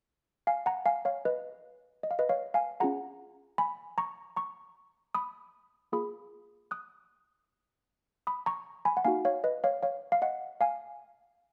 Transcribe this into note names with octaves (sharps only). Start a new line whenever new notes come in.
F5 G#5
F#5 A#5
F5 G#5
C#5 F5
B4 D#5
D#5
F5
B4 D#5
C#5 F5
F5 G#5
C#4 F4 G#4 F#5 A#5
G#5 B5
A#5 C#6
A#5 C#6
B5 D#6
A#3 F4 G#4 B5 D#6
D#6 F#6
B5 D#6
A#5 C#6
G#5 B5
F#5
A#3 D#4 F#4 F5 G#5
C#5 F5
B4 D#5
C#5 F5
C#5 F5
F5
D#5 F#5
F5 G#5